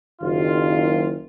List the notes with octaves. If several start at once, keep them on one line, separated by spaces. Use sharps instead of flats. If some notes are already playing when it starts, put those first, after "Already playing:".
F#1 D#3 F4